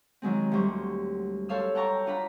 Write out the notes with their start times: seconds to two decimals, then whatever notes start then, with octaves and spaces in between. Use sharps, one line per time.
0.22 D#3 F#3 G#3 C4
0.52 D2 F#3 G3 C5 C#6
1.49 A4 C5 C#5 F5 E6
1.75 F#5 G5 A5 A#5 C#6
2.06 D4 F4 F#5 A#5 B5